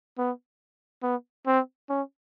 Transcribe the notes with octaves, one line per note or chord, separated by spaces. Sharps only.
B3
B3
C4
C#4